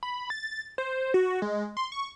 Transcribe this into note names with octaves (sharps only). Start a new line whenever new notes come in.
B5
A6
C5
F#4
G#3
C6
C#6